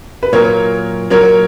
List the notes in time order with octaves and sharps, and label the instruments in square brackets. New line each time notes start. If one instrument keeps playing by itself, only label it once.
[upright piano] B4
[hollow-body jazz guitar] A#2 F#3 A#3 [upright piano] A#4 C#5
[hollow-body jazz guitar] A#2 F#3 A#3 [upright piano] A#4 C#5